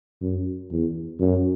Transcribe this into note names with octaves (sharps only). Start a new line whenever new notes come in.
F#2
E2
F#2